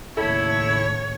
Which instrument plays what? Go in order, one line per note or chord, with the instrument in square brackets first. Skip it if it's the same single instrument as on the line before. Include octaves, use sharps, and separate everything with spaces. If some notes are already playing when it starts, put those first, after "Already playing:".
[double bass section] D#2 A2 C#3 [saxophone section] E4 [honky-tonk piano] A4 [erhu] C#5